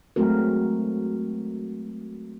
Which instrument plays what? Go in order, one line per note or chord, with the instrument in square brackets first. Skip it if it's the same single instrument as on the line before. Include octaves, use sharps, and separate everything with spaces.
[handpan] F#3 G#3 A3 C4 F#4 A#4